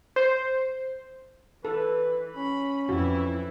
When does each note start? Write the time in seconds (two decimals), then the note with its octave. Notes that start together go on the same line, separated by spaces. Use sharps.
0.16 C5
1.65 E3 A4 B4
2.36 C#4 B5
2.89 F2 E3 E4 F#4